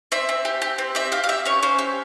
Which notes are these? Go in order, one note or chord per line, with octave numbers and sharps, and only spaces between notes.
C4 E5
C4
G4
G4
C4
C4 E5
G4 F5
F5
G4 E5
C#4 C#5
C#4 C5
G4